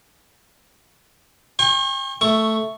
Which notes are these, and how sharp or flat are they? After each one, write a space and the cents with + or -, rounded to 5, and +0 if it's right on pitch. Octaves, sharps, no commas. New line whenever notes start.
G5 +35 C#6 -40
A3 +0 C#6 +0